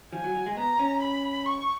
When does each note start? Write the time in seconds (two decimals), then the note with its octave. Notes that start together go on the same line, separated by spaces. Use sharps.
0.13 F3 G#5
0.24 F#3
0.35 F#3
0.46 G#3
0.57 B3 A#5
0.79 C#4
1.03 B5
1.46 C#6